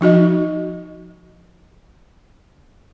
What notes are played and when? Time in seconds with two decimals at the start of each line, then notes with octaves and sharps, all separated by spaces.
0.01 F3 D#4 F#4 D#5